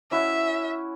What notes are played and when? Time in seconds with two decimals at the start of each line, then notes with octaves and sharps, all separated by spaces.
0.11 C#4 E4 F#4 E5